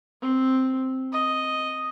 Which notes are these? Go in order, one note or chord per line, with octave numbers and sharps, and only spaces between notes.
C4
D#5